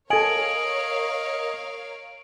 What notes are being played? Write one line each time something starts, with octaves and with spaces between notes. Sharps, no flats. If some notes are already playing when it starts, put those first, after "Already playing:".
A4 A#4 C#5 D#5 F5 G#5 D7 F#7